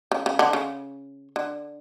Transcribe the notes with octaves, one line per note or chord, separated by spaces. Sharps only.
C#3
C#3
D3
C#3
D3